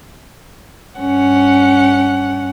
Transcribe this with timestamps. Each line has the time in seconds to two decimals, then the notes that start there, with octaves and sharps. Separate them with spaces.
1.00 G2 C#4 F#5